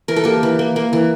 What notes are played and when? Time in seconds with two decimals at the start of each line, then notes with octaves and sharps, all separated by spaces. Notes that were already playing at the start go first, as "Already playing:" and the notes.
0.08 E3 A#4
0.16 A4
0.24 A#3 G4 A#4
0.43 E3
0.59 A#3
0.76 A#3
0.93 E3